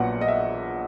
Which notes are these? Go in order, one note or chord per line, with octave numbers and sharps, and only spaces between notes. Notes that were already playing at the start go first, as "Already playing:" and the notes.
Already playing: A#1 A#2 F#3 B3 F#5
D#5
E5